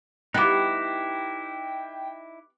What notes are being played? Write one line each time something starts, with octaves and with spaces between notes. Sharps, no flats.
B3 D#4 E4 G4 G5 D6 F#6